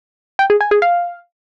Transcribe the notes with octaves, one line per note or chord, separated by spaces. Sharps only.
G5
G#4
G#5
G#4
F5